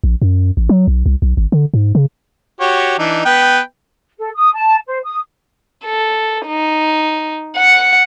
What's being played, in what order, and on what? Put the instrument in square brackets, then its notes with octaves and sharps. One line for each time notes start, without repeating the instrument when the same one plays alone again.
[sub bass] A#1
F#2
A1
F#3
B1
C2
B1
G#1
D3
G#2
C#3
[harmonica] F#4 G4 C#5
E3 D4 D#4
B3 B4 G5
[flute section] A4
D#6
A5
C5
D#6
[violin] A4
D#4
F#5 C#7